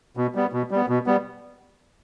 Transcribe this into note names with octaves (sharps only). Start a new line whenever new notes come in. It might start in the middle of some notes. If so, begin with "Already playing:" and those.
B2
G3 B3
B2
G3 B3
B2
G3 B3